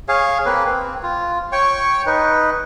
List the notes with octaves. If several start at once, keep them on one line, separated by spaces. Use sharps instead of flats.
G#4 C#5 F5
A#3 C4 B4
C4
F4
C#5 G5 C#6
D#4 B4